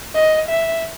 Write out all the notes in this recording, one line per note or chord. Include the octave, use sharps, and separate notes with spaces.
D#5
E5